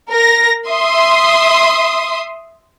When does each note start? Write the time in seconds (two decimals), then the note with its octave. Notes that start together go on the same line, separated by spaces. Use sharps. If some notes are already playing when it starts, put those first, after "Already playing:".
0.11 A#4 A#6
0.68 E5 C6 D#6